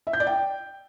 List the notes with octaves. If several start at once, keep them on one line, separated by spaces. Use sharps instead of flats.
E5
G6
D5
G5